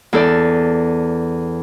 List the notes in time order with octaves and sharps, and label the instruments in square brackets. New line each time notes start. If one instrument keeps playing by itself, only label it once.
[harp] E2 A4 D5